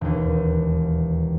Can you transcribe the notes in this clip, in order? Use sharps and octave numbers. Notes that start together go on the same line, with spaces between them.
E1 D#2